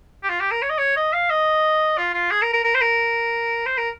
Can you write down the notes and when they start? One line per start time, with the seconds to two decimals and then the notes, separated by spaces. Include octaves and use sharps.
0.23 G4
0.29 F4
0.40 G4
0.51 A#4
0.62 C#5
0.70 D#5
0.78 C#5
0.96 D#5
1.13 F5
1.30 D#5
1.98 F4
2.13 F4
2.31 G#4
2.42 A#4
2.53 A#4
2.64 A#4
2.75 C5
2.81 A#4
3.66 C5
3.78 A#4